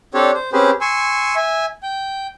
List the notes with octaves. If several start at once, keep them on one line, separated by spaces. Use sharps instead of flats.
C4 D4 G4 A4 C#5 D5
C5
C4 C#4 G4 G#4 B4 C5
G#5 C6 C#6 E6
E5 G#5
G5